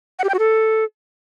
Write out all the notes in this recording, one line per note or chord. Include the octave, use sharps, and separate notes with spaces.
F#5
G4
G5
F#4
A4